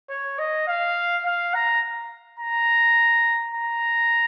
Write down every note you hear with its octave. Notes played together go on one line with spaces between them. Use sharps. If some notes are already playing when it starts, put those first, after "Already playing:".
C#5
D#5
F5
F5
A#5
A#5
A#5